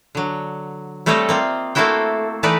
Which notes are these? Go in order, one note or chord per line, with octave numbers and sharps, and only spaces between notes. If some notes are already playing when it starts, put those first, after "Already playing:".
D3 F#3
G3 A3 C4 A4 C#5 D#5
A#3 C4 F4
A3 A#3 C4 E4 F#4 G5
E3 A3 D#4 A4 B4 D5